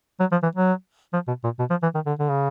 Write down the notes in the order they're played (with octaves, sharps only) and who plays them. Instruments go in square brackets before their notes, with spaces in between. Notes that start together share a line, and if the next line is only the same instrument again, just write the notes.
[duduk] F#3
F3
E3
F#3
F3
B2
A#2
B2
F3
E3
D#3
D3
D3
C#3